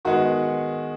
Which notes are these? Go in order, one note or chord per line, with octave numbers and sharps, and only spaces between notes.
D#3 G#3 B3 F#4